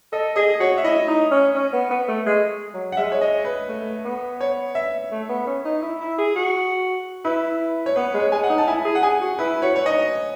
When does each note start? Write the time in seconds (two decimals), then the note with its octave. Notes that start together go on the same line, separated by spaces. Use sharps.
0.12 A4 D#5
0.36 G#4 D#5
0.60 F#4 C#5
0.78 E5
0.84 E4 D#5
1.07 D#4
1.31 C#4
1.55 C#4
1.73 B3
1.90 B3
2.08 A3
2.26 G#3
2.74 F#3
2.92 F#5
2.97 G#3 E5
3.12 C#5
3.21 D#5
3.45 B4
3.69 A3
4.05 B3
4.41 C#5
4.75 E5
5.11 A3
5.29 B3
5.47 C#4
5.65 D#4
5.82 E4
6.01 E4
6.18 G#4
6.36 F#4
7.24 E4 B4
7.86 C#5
7.96 B3 B4
8.14 G#3
8.20 C#5
8.32 G#3 G#5
8.44 F#5
8.49 D#4
8.58 A5
8.67 E4 G#5
8.85 G#4
8.95 F#5
9.03 G#4 G#5
9.21 F#4
9.39 E4 B4
9.62 F#4 C#5
9.76 C#5
9.86 D#4 D#5